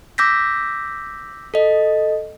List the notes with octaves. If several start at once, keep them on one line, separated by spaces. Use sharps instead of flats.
D6 E6 G6 A#6 B6
A4 D#5